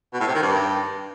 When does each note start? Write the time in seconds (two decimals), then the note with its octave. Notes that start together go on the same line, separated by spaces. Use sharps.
0.13 B2
0.20 A2
0.28 C3
0.35 D#3
0.42 G2